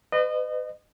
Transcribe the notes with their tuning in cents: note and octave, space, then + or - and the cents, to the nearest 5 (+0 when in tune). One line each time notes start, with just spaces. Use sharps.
B4 +40 D#5 -30